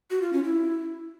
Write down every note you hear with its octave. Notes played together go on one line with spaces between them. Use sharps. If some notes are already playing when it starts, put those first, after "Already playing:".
F#4
F4
C#4
E4